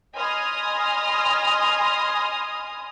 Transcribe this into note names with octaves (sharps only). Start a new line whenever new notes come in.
D#5 G#5 B5 C6 D#6 F6